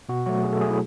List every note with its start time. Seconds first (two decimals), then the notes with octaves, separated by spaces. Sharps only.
0.09 B2 F#4
0.26 F#3 A3 F#4
0.43 B2 G#4
0.53 A4
0.61 F#3 A3 G#4
0.70 E4